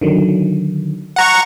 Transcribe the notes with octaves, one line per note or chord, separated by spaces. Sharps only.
D3 D#3 F#3
F#5 A#5 C#6